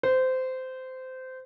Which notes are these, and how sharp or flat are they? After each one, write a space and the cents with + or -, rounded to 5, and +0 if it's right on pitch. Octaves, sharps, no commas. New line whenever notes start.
C5 -20